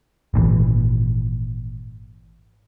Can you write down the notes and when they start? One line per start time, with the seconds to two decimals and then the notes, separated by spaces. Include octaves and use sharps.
0.34 G#1 A#2 C#3 E3